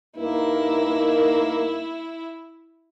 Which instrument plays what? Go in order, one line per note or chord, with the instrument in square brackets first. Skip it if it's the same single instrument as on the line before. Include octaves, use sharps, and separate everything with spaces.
[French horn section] G2 D#4 A#4 [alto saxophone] A#3 [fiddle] E4